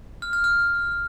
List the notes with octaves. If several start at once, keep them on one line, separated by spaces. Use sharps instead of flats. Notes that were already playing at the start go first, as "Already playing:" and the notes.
F6
F6
F6